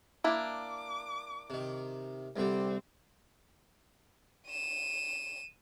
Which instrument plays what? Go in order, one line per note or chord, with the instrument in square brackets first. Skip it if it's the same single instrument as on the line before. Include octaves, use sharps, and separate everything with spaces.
[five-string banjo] A#3 D4 E4 [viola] D6
[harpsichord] C3 D#3
[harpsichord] C2 D3 G3 [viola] C4
[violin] D#7 E7